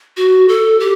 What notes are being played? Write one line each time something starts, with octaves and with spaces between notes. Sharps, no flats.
F#4
A4
G4